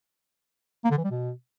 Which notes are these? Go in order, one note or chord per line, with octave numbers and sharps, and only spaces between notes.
A#3
D3
E3
G3
B2